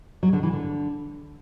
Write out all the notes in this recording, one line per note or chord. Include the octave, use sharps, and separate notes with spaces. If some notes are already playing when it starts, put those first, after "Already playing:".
F#3
D3
E3
D3